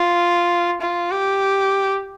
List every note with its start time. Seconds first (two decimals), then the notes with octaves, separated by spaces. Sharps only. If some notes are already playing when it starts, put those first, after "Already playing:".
Already playing: F4
0.81 F4
1.11 G4